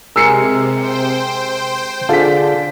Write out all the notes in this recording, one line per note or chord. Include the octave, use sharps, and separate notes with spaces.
C3 G#3 G#4 A#4 E6 C7 C#7
C5 G5
D3 F4 G#4 D5 A5 B6